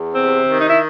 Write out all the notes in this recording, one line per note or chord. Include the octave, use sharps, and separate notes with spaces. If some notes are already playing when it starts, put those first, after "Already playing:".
Already playing: E2
C3 C4
D#3
D#4
E4